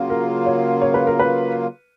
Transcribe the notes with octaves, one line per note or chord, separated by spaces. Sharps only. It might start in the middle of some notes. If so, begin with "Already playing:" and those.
Already playing: C#3 F#3 A#3 F4
A#4
C#5
C#5
B4
A#4
B4